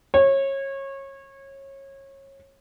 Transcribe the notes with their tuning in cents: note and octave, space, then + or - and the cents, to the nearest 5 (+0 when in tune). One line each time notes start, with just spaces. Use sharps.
C#5 -25